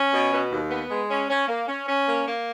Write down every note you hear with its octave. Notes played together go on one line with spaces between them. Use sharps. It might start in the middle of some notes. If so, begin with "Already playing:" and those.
Already playing: C#4
B2
B2
D#2
B3
G#3
C#4
C#4
A#3
C#4
C#4
A#3
A#3